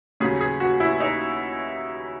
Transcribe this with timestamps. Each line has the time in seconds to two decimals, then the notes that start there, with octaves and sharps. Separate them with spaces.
0.20 D#2 C#3 F#3 G#4
0.41 G#4
0.60 F#4
0.80 E4
1.00 D#4